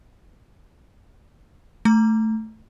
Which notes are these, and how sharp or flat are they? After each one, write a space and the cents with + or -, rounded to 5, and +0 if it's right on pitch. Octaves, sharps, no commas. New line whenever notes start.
A3 +0 A#5 +5